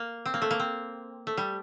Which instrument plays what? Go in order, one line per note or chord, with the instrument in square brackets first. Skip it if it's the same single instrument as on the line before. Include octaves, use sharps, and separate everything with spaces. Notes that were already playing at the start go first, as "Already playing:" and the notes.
Already playing: [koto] A#3
C4
A#3
A3
A#3
C4
A3
G3